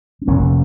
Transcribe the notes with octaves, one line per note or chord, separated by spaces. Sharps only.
C4
F1 F2 C3 A#3 C#4